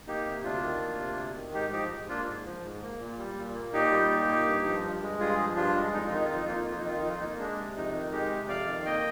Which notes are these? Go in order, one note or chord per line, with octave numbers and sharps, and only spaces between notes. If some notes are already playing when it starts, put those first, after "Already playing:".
A#3 D#4 G4
C3
D2 D4 F4
D#3
A#3
C3
D2
D#3
G#2 D#4 G4
F3 D#4 G4
G#2
A#3 D4 F4
G#2
F3
G#2
A#3
A#2
G3
A#2
A#3
A#2 D#4 G4
G3
A#2
A#3
G2
F3
G2
G#3
G2 F4 G#4
F3
G2 D4 F4
G#3
F2 D#4
F4
D#3 D#4
F2 F4
D#4
A#3 F4
D#4
F2 F4
D#4
D#3 F4
F2 D#4
F4
A#3 D#4
G#3 D4
C3
F2 D#4
D#3
G#3 D#4 G4
C3
F2 D5 F5
D#3
A#3 D#5 G5